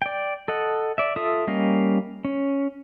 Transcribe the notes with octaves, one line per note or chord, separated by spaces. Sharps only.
D5 G5
A4 D#5 F#5
D5 E5
F4 A4 E5 D#6
G3 A#3 C#4 D#5 F5
C#4